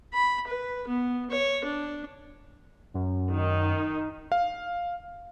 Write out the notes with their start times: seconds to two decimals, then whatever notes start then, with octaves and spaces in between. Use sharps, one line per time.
0.14 B5
0.47 B4
0.87 B3
1.30 C#5
1.65 D4
2.94 F#2
3.32 D#3 D#4
4.32 F5